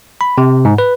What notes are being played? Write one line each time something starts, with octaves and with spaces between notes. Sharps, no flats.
B5
C3
G#2
B4